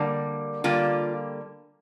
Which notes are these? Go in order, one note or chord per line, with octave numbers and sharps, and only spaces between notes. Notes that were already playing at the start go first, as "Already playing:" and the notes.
Already playing: D3 G3 A#3
D3 G3 A#3 F4